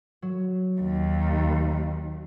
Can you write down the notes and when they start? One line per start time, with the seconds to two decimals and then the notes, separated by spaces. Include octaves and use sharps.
0.22 F#3
0.81 D#2